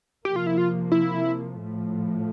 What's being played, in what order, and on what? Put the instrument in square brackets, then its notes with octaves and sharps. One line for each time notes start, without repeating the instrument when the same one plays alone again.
[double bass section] C3 F3 A#3 [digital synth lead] G4
[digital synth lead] F4
E4
F4
E4
[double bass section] A2 F3 A3